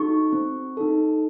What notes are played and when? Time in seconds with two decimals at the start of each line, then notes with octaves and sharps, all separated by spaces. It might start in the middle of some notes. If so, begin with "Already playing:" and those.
Already playing: D#4 F#4 A4 C#6
0.33 C4
0.77 D#4 A4